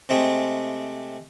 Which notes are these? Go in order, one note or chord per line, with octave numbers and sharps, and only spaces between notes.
C3 G#3 A3 C4 G4 G#4